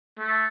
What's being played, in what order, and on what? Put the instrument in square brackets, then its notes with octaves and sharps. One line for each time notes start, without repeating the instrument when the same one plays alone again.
[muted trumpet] A3